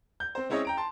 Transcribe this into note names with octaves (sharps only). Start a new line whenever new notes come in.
G6
C4 C5
G#3 C4 C#4 E4 C#5 D#5
G5 A#5 D7
A5 C6